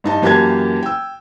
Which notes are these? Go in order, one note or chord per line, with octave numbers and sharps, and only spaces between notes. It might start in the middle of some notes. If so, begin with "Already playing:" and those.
G2 D#4 A5
F#2 E3 A#3 G4 A5 G#6
G5 E6